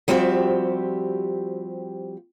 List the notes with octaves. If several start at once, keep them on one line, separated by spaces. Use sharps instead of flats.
F3 G3 C4 F#4 G4 E5